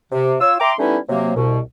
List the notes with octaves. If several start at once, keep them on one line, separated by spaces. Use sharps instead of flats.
C3
F4 C#5 E6
E5 G5 A#5 C6 D6
G3 A3 B3 C#4 D#4 E4
C3 F#3 A#3
C2 B2